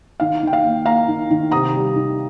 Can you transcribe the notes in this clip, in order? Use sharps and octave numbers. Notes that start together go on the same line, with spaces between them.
D#3 F5
D#3 G5
F5
A#3
A#3 F5 A#5
D#3
D#3
C3 A#5 D#6
G3
D#3